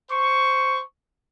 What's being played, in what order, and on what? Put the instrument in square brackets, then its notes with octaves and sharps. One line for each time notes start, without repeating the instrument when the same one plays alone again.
[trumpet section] C5 C#6